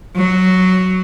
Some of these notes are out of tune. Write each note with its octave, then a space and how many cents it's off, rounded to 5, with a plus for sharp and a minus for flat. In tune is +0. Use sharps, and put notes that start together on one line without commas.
F#3 +5